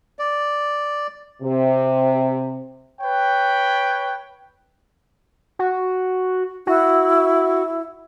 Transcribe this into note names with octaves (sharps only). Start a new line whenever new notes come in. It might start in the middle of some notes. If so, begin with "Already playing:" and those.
D5
C3
B4 C#5 G5
F#4
E4 F#4